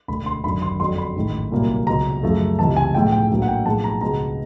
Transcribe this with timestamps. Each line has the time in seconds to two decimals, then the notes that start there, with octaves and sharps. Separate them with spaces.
0.08 E1 D2 D3 B5
0.26 C6
0.44 G#1 F#2 D3 B5
0.62 C6
0.80 F2 D3 F#3 C6
0.98 B5
1.16 A1 G#2 D#3
1.51 C2 A#2 F#3 A#3
1.87 C#2 B2 F#3 A#5
2.23 F#2 C#3 F3 A3
2.59 C#2 C3 E3 A5
2.76 G#5
2.95 B1 A2 F3 G#3 B3 G5
3.12 G5
3.30 A#1 A2 F#3 A#3
3.42 F#5
3.48 G5
3.66 B1 A2 F3 G#3 B3 A5
3.84 A#5
4.01 C#2 B2 G#3 B3 A#5